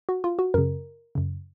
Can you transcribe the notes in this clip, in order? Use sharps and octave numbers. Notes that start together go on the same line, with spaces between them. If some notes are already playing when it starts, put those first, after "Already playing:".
F#4
F4
F#4
F#2 C#3 A#4
F#2 C#3